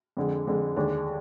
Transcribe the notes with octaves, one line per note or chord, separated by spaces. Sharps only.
F2 D3 G#3
F2 D3 G#3
D#2 D3 G#3 D4